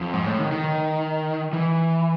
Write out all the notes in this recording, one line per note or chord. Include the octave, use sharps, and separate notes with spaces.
F2
G#2
A2
D#3
D#3
E3